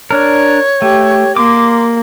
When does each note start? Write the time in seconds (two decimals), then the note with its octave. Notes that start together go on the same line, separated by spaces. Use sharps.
0.11 D4 A#4 C#5
0.82 A3 G4
1.36 A#3 C6 D6